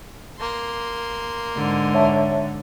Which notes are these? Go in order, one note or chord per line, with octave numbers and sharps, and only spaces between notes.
A#3 C6
G#2 D3
C#5 E5 A5